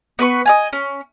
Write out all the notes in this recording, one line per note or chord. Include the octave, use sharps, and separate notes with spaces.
B3 B4 C#6
D#5 F5 G#5
C#4